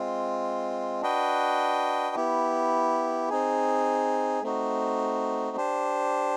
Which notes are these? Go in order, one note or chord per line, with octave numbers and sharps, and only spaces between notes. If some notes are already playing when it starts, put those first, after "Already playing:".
Already playing: G#3 C4 F4
D4 F#4 B4 D#5 G5
B3 E4 G4
C4 D#4 G#4
A3 C4 D#4 F#4
D4 G4 C5